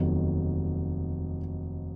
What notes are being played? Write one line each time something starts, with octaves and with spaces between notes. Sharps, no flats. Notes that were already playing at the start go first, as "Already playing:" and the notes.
Already playing: F1 D#2 D#3 F#3 B3